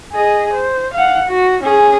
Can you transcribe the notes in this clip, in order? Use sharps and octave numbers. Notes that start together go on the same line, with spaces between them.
G#4 D#5
C5
F5 F#5
F#4
C#4 G#4